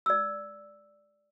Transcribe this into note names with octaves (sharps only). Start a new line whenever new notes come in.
D5 E6